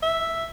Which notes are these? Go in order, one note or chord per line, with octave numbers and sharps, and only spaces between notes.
E5